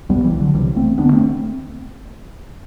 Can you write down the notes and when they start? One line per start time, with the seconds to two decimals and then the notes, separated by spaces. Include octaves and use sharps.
0.09 C2 B2 G3 B3
0.24 E3 G3
0.40 D3 F#3
0.54 C2 C3 E3 G3
0.76 A3 C4
0.98 D2 D3 B3 D4
1.12 A3 C4